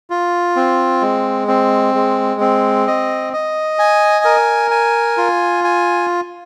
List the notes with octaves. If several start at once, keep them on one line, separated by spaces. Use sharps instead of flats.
F4
C4
G#3
C4
G#3
C4
D#5
D#5
G#5
A#4
G#5
F4
G#5